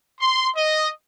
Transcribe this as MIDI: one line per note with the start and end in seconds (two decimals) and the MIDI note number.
0.21 0.49 84
0.56 0.90 75